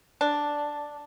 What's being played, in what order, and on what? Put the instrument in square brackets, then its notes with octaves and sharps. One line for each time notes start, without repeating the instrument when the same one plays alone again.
[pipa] D4